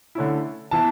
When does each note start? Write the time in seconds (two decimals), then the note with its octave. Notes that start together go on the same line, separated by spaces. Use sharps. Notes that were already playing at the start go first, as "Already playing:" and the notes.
0.15 D3 A3 C#4 E4
0.71 E3 B3 E4 A5